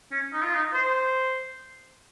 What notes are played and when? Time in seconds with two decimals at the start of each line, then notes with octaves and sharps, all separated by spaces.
0.12 C#4
0.33 D#4
0.43 F4
0.55 D#4
0.74 C5